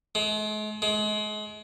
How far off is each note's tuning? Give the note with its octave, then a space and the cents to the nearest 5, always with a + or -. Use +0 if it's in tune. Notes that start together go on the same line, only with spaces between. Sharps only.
G#3 +45
G#3 +35